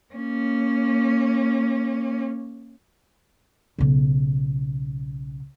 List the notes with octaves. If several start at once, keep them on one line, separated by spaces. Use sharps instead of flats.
A#3 C#4
B1 C#3